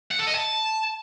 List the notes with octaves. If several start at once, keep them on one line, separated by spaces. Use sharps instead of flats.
F#5
A4
D#5
A5